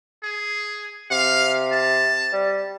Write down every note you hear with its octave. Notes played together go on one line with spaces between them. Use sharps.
G#4
C3 F5
A5
G3